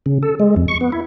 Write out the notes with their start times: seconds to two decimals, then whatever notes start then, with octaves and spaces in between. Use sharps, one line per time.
0.06 C#3
0.23 A4
0.40 G#3
0.56 F2
0.68 C#6
0.81 B3
0.92 E4